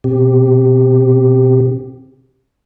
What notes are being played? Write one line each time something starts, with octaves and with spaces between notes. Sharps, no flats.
B2 C4 G4